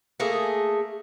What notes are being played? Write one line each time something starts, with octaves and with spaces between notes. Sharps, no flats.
A3 A#3 G#4